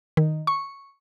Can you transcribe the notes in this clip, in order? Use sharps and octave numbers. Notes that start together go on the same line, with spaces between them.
D#3
C#6